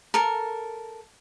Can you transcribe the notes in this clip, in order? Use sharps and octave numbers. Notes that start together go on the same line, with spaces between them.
A4 A#4